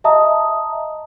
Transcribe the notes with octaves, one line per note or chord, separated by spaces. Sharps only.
D#5 E5 A5 A#5 D#6